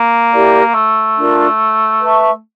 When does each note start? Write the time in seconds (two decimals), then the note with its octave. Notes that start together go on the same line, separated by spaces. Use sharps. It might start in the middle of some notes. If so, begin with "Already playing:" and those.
Already playing: A#3
0.32 E4 G4 A#4 D5
0.74 A3
1.17 D4 F4 A#4
2.01 B4 E5 A5 C#6